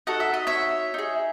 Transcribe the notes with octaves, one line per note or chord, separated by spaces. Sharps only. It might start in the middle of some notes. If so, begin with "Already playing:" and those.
D#4 F#4 A4 F#5
E5
D#5
C#5 E5
D#4 G#4